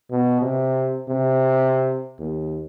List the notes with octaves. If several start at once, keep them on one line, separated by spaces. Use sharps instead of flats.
B2
C3
C3
D#2